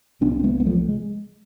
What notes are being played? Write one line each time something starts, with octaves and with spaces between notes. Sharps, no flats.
C2 C3 B3 D4
C4
G#3 B3
B3
F3 A3
G#3